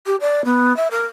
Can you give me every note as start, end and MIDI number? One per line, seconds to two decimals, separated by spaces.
0.06 0.16 67
0.21 0.42 74
0.45 0.75 59
0.76 0.88 76
0.91 1.06 70